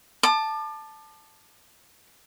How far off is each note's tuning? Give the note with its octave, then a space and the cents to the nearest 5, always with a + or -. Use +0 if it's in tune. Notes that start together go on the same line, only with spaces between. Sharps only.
A5 +0 D6 +35